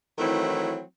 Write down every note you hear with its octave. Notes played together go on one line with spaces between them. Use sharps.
D#3 E3 F#3 A3 C4 E4